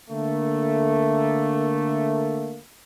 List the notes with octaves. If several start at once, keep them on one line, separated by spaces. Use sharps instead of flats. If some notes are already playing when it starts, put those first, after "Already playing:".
D3 A3 A#3